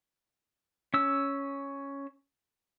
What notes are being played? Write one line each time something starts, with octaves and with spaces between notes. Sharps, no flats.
C#4 E6